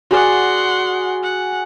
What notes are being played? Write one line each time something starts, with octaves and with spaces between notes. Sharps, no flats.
F#4 G#4 D5 F#5 C6
F#5